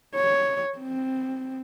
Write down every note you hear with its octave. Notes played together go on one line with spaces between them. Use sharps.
C#5
C4